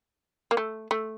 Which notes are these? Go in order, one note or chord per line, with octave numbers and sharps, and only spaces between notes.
A#3
A3
A3